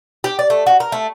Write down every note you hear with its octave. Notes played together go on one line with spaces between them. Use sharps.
G4
D5
A3
F#4
A#4
A3